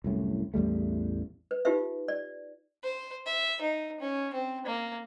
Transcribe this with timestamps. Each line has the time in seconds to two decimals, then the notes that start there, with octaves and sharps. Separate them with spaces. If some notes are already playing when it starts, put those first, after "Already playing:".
0.04 C2 F#2 A2
0.54 A1 E2 G3 A3
1.51 B4
1.65 D#4 F4 G4 B4 E5
2.08 D5
2.83 C5
3.26 E5
3.61 D#4
4.00 C#4
4.33 C4
4.66 A#3